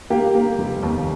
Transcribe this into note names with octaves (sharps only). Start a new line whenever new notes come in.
A#3 G4
A#3
F1
D#2